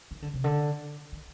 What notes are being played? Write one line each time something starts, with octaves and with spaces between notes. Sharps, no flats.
D#3
D3
C3
D3
D#3